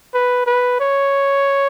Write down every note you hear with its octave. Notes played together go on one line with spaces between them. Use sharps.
B4
B4
C#5